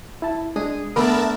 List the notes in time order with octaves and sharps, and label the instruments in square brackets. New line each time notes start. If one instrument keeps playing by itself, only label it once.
[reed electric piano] E4 A5
[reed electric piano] G#3 D4 D#6 [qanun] G#4
[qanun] A3 B3 D4 [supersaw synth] A#4 E5 A5 [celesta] B5 [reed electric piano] D6